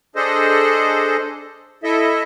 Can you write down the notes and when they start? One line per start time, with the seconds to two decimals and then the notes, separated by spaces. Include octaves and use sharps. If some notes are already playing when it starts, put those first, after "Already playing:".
0.16 D4 G#4 A4 C5 D#5
1.84 E4 A4 D#5 E5